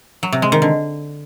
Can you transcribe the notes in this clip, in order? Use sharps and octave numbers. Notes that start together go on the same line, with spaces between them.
F#3
C3
G#3
D#3
D3